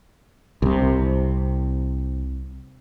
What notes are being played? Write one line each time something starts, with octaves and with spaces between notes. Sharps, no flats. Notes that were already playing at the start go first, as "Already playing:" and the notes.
C2 C3